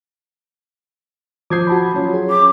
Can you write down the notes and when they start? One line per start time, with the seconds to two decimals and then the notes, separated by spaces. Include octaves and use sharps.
1.50 F3 D6 D#6 G6 G#6 C7
1.67 F#4 A5 B5
1.94 F#3 C#4 F4
2.14 G#4
2.30 D6